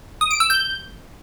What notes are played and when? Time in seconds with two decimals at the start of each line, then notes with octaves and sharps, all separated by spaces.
0.21 D#6
0.31 D7
0.40 E6
0.50 G6